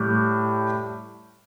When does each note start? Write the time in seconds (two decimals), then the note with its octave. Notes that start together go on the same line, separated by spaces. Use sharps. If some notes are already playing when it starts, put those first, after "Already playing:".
Already playing: A2 G3